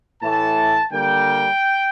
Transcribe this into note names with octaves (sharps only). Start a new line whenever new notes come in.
A2 E3 A3 A5
D3 G3 A#3 G5